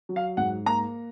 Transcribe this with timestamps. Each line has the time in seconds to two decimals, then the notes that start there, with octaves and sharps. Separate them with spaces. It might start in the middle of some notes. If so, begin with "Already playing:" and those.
0.09 F#3
0.16 F5
0.37 G#2 F#5
0.66 A#3 A#5